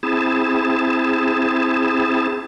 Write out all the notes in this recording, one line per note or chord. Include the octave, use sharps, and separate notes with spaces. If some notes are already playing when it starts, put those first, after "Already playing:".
C4 E4 G#4 A5